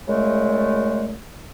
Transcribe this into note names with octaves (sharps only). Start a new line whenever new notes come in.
A#2 C#3 G#3 A3